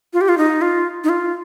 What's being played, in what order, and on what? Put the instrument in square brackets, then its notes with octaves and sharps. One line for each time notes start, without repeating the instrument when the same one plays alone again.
[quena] F4
G4
F4
D#4
F4
D#4
F4